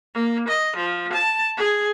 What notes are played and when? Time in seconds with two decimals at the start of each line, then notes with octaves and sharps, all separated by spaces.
0.14 A#3
0.48 D#5
0.76 F3
1.13 A5
1.57 G#4